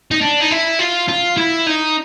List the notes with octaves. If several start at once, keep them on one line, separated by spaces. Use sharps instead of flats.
D#4
D4
D#4
E4
F4
F4
E4
D#4